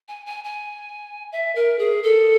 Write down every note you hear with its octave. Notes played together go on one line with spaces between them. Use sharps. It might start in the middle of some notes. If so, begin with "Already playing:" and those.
G#5
G#5
G#5
E5
A#4
G#4
A4